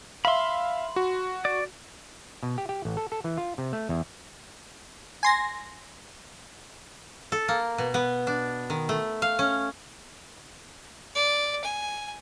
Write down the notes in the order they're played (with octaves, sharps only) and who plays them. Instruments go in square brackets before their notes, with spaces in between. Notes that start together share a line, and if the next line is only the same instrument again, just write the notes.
[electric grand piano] E5 F5 [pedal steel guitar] B5 C6
[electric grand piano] F#4
[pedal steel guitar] D5
[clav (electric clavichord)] B2
G4
G4
A1
A4
A4
E3
F4
C3
A3
E2
[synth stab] G#5 C6 A#6
[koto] A4
A#3
B2
B3
D4
D#3
A3
F5
C#4
[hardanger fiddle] D5
G#5